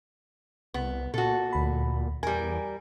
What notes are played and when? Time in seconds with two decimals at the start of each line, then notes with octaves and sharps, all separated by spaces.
0.74 C2 B3
1.14 A#2 F#4 A4
1.53 D2 B5
2.23 E2 G3 A#4 G#5